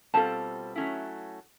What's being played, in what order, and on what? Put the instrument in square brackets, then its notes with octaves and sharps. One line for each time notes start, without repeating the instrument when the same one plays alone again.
[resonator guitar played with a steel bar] B2 G3 C4 F4 A4 [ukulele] A5
[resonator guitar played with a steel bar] F#3 A3 C#4 E4